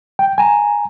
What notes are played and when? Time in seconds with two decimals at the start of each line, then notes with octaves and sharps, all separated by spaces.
0.19 G5
0.38 G#5 A#5